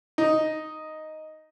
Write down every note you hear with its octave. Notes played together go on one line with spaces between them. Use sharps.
D#4